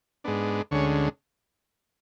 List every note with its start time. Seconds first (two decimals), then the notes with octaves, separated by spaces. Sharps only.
0.24 G#2 G#3 B3 D4
0.71 D2 D3 G#3 C#4 C#5